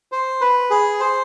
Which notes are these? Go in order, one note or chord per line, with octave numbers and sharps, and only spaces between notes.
C5
B4
G#4
C5